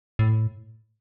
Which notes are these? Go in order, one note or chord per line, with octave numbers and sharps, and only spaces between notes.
A2